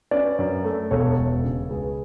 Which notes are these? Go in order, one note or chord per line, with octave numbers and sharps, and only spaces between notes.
C#4 B4 D5
F#2
A3
E1 A4 C#5
E1
C#3
C#2 G#4 B4